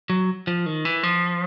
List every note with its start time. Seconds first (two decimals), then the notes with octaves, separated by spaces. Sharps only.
0.10 F#3
0.47 F3
0.66 D#3
0.85 E3
1.03 F3